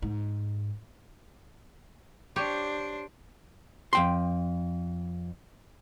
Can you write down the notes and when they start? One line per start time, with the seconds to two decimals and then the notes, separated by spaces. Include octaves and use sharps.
0.02 G#2
2.36 D4 G4 C5 C#5
3.93 F2 G5 C6